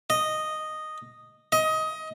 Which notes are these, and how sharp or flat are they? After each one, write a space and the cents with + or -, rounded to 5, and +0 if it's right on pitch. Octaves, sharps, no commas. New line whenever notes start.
D#5 -5
D#5 +20